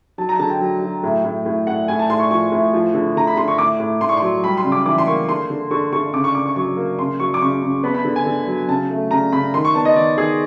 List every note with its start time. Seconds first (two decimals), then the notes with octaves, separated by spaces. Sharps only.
0.18 F#3 A5
0.29 A#5
0.39 D3 A5
0.50 G5
0.60 F#3
0.82 F#3
1.03 A2
1.24 A2
1.46 A2
1.67 A2 F#5
1.88 A2 G#5
1.99 A5
2.09 A2 C6
2.20 C#6
2.30 F3 C#6
2.52 A2
2.73 F3
2.94 D3
3.16 D3 A#5
3.27 B5
3.37 D3 C6
3.48 C#6
3.58 A2 D6
3.80 A2
4.01 A2 C6
4.09 C#6
4.17 F#3 C6
4.43 G3 B5
4.57 C6
4.64 C#3
4.72 D6
4.86 E3 D6
4.98 C6
5.07 A#3 C#6
5.28 D3 C6
5.50 D3
5.71 D3 C#6
5.93 D3 C#6
6.14 C#3 D6
6.24 C#6
6.35 C#3 D6
6.46 C#6
6.56 F#3 C#6
6.77 A#3
6.99 C#3 C6
7.20 F#3 C#6
7.34 D6
7.41 C#3 C#6
7.63 C#3
7.83 B3 B5
7.94 B5
8.05 D3
8.16 G#5
8.26 D3
8.47 F#3
8.68 C#3 A5
8.90 A3
9.11 C#3 A#5
9.32 C#3 B5
9.54 D#3 C6
9.65 C#6
9.75 B3 A5
9.85 D#5
9.96 D#3 D5
10.18 D#3 G#4